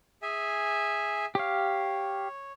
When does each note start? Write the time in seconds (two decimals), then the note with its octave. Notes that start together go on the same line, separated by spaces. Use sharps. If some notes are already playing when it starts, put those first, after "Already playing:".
0.22 G#4 E5 G#5
1.35 G4 C#5 F5